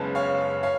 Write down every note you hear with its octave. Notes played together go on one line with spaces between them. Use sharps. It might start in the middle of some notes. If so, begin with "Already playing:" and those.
Already playing: F#1 F#2 C#3 G#3 B3 A5
C#5 F5
C#5 F5